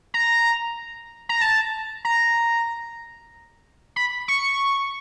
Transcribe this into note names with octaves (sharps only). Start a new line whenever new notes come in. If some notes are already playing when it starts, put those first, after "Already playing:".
A#5
A#5
A5
A#5
B5
C#6